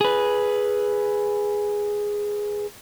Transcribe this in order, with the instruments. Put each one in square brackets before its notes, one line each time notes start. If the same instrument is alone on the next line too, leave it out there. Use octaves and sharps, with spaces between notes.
[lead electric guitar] G#4 B4